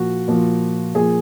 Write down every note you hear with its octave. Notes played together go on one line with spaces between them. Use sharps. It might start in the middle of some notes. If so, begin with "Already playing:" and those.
Already playing: A#2 F3 F#4
A#2 F3
A#2 F3 G#4